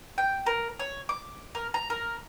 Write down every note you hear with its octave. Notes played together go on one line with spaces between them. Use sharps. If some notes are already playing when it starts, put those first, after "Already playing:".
G5
A#4
C#5
D6
A#4
A#5
A#4